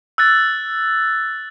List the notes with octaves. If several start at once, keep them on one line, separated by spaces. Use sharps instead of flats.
E6 F#6 A6